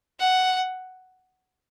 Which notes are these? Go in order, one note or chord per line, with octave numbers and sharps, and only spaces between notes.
F#5